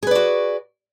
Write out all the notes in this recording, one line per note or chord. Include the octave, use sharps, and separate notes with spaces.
F#4 G#4 B4 D5